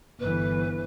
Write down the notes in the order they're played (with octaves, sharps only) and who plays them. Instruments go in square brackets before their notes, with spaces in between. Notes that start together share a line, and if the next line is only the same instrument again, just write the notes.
[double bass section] G1 E3 [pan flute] B4